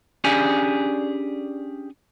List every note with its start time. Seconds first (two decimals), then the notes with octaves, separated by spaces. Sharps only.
0.24 C#4 D4 G4 G#4 D5 G#5